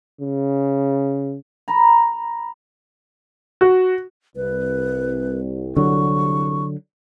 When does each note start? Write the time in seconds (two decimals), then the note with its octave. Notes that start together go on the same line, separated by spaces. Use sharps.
0.21 C#3
1.68 A#5 B5
3.61 F#4
4.36 C2 B4
5.77 D3 F#3 C#6